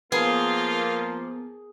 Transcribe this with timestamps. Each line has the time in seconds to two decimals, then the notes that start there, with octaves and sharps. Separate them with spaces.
0.12 F3 A#3 B3 F4 G#4 A#4